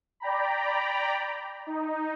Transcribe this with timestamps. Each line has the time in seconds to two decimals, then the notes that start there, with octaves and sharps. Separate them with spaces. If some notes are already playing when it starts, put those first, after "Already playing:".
0.20 D5 G5 A#5 B5
1.67 D#4